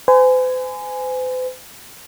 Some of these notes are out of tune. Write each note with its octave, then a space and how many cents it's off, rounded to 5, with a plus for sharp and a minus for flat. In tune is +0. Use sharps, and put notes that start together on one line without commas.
C5 -45 G#5 +0